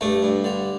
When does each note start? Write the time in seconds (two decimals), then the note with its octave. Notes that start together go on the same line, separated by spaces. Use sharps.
0.01 G2 A3
0.23 G2
0.44 D3